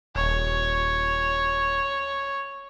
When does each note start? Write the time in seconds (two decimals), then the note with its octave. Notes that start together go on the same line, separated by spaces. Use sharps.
0.16 D#1 C#5